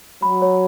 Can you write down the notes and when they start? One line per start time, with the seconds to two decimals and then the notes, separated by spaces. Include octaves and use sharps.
0.22 F#3 B5
0.42 C#5